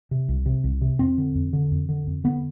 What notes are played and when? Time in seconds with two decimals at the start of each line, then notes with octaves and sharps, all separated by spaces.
0.11 C3
0.28 C2
0.46 C3
0.64 C2
0.81 C3
0.99 F2 C4
1.18 D3
1.35 F2
1.53 D3
1.71 F2
1.89 D3
2.07 F2
2.24 D3 B3